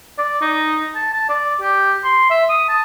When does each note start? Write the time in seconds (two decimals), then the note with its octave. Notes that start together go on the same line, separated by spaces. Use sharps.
0.18 D5
0.41 D#4
0.95 A5
1.13 A5
1.29 D5
1.61 G4
2.04 C6
2.30 E5
2.49 D#6
2.69 A5